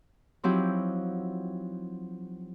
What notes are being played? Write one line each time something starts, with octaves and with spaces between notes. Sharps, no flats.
F3 F#3 C4 D#4 E4 G4